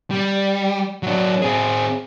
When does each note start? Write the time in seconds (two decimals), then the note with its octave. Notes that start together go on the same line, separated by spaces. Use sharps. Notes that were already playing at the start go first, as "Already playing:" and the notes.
0.11 G3
1.03 F#3 D4
1.42 C4 G#4